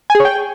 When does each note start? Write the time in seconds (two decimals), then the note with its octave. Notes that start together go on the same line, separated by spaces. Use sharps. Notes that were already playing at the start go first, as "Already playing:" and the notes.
0.10 G#5
0.15 G#4
0.20 C#5
0.25 G5